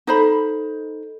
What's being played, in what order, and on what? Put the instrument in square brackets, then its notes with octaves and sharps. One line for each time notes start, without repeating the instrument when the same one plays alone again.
[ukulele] D#4 C5 B5 [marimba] A4